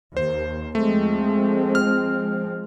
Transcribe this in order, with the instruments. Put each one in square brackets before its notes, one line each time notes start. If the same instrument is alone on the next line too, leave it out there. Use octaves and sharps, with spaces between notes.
[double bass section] D#2 [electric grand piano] C5
[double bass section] F3 G#3 C4 [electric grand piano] A3
[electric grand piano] F6